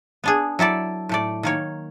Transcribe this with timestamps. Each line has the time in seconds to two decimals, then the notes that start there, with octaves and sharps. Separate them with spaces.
0.24 B3 D4 G#4
0.59 F#3 E4 A4 D5
1.09 A2 A3 D5
1.43 D#3 A#3 C#5